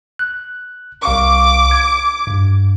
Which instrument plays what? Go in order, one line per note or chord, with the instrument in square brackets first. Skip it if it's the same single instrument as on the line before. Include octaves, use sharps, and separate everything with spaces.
[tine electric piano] F#6
[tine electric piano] C2 F5 C#6 [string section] D6
[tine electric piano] G#6
G2